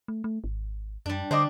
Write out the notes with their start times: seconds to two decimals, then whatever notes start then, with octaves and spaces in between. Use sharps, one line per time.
0.08 A3
0.24 A3
0.44 G#1
1.06 F#2 G3 D4
1.31 D3 D4 C5 D5 D#5